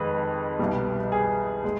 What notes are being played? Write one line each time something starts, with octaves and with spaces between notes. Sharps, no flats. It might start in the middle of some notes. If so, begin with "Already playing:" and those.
Already playing: F2 D#3 G#3 B4
C2 B2 G3
G#4
G#3